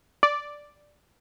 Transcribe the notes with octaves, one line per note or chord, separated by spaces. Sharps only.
D5